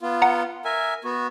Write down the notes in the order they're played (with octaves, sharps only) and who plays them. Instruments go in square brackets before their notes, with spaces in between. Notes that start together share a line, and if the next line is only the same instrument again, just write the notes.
[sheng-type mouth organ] B3 F4
[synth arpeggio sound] F#5 A#5
[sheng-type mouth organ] A#4 E5 G#5
B3 F#4